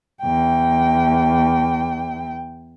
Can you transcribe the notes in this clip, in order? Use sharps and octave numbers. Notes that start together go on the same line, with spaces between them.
E2 G5